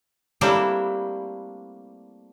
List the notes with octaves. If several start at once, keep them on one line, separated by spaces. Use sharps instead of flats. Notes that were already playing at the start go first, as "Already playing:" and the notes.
G3 A3 A#3 C4 D4 E4